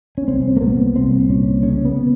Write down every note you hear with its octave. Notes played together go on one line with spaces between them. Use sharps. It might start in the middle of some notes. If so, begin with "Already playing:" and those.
C#4
C2 C4
A#3
A#2 B3
C2 C4
A#2 C#4
C#3 C#4
B3